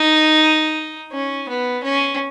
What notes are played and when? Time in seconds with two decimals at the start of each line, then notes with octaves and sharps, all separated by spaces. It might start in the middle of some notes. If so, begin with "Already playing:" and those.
Already playing: D#4
1.12 C#4
1.49 B3
1.84 C#4